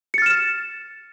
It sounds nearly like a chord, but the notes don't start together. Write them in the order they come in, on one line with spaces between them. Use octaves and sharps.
C#7 A6 F6 E7